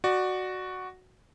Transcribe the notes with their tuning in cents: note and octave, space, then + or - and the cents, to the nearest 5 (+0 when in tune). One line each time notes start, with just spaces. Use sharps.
F#4 +0 D5 +20